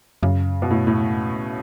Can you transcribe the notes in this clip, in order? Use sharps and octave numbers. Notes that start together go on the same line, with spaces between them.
F#2 C#3
B2
A2
A2